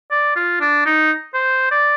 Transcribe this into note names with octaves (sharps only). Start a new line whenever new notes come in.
D5
F4
D4
D#4
C5
D5